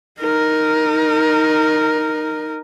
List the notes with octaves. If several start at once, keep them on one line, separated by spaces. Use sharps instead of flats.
D#4 A#4